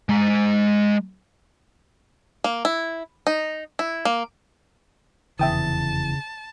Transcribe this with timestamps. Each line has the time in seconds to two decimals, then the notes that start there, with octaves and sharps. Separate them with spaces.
0.09 G#3 A#5
2.44 A#3
2.65 E4
3.27 D#4
3.79 E4
4.05 A#3
5.39 F1 E2 C#3 E3 E5 G5 A5 D#6